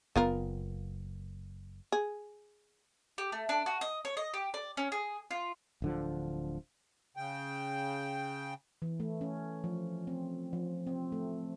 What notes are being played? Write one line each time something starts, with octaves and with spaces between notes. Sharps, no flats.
F#1 B3 F4 A#4
G#4
G4
A3
D4
F#4
D#5
C#5
D#5
G4
D5
C#4
G#4
F4
D1 D3 F3
C#3 G5
E3
A3
C#4
F3
C4
F3
C4
A3